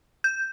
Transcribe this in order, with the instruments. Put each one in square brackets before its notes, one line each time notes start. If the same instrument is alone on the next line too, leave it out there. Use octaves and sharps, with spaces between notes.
[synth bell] G6